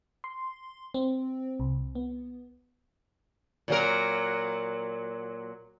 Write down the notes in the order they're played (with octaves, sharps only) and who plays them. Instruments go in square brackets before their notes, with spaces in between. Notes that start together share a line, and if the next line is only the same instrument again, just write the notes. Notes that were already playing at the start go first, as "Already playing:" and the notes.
[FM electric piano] C6
C4
C2
B3
[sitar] A#2 F#3 A#4